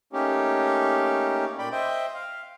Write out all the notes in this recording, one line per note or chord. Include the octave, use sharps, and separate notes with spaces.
A3 A#3 C#4 D#4 G4
A#2 D5 G5 B5
C5 D#5 E5 G5
F5